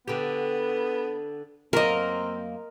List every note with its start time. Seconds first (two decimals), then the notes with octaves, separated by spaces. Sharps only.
0.08 D3 B3 G4
1.73 F#2 A#3 C4 A#4 D#5